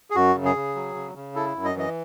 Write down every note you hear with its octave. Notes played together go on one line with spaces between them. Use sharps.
G#4
F#2 F#4
C#3
G#4
C#3
F#3
C#3
C#3
E4 A4
F#2
D#5
E3 D#5